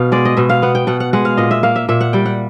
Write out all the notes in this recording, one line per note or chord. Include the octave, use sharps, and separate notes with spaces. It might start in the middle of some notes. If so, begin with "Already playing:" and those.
Already playing: B2 B3 F5
G#3 D5
D#5
B2 E5
F5
B3 F#5
G5
B2 F#5
F#5
G#3 F#5
F5
A#2 D#5
E5
A#3 F5
E5
A#2 E5
F#5
G3 G5
F#5